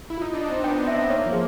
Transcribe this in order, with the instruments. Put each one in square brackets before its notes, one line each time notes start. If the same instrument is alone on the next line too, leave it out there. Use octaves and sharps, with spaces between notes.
[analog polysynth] E4
[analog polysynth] D#4 [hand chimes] F4
[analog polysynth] D4
[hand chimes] D#5
[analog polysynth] C4
[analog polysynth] B3 [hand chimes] G5
[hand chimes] E5
[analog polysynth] A#3 [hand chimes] C#5
[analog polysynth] F3
[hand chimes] G#4